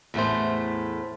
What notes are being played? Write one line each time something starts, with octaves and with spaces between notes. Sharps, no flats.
E2 A2 A3 C5